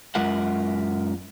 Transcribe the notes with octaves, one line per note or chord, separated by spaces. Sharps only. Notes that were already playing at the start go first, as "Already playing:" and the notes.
F#2 G#3 F4 A#4 E5 F#5